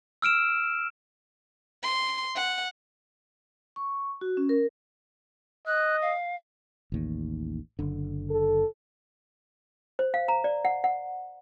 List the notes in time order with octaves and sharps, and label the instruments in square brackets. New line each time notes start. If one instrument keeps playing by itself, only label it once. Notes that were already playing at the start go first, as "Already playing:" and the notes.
[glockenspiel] E6 F6 D7 E7
[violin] C6
F#5
[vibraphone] C#6
F#4
C#4
A#4
[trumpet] D#5 [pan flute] F#6
[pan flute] F5
[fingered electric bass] A1 D#2
F#1 D3
[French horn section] A4
[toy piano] C5
F5
A#5
D5
F#5
F#5